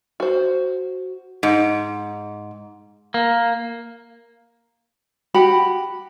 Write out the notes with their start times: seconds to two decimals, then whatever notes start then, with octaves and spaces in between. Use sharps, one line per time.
0.20 F#4 C5
1.43 G#2
3.14 A#3
5.34 F#4 G4 F#5 B5